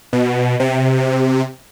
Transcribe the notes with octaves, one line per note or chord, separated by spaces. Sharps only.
B2
C3